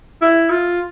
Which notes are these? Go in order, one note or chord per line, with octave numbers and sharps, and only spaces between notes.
E4
F4